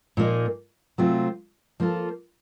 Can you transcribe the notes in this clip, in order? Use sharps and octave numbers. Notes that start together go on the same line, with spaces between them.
A#2 F3 A#3 D#4
C3 F#3 A3 C4 F4
F3 A#3 F4 A4